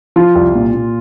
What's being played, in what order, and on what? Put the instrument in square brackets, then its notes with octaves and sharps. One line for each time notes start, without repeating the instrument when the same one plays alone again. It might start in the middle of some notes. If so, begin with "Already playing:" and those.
[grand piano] F3 [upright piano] F4
[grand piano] C2
A#2
A#2